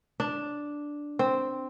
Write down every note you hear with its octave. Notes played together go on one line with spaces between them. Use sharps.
D4
C4